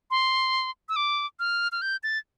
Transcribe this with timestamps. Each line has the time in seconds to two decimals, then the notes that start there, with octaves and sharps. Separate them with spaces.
0.11 C6
0.89 E6
0.96 D6
1.39 F6
1.72 F6
1.82 G6
2.03 A6